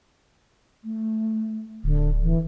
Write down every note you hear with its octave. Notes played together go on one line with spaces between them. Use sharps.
A3
D1 D3
E3